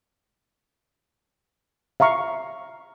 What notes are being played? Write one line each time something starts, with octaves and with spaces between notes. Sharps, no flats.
E5 F5 A#5 C#6